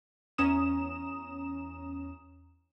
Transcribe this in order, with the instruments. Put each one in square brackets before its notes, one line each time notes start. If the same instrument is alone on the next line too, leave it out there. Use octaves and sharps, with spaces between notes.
[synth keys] E2 C#4 A#5 D#6 E7